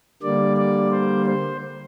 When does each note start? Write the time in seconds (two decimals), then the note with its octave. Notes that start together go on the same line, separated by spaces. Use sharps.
0.22 D3 G3 A#3 D5
0.57 D5
0.91 C5
1.26 C5